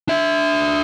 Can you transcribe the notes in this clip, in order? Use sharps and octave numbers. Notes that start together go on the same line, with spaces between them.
D4 E5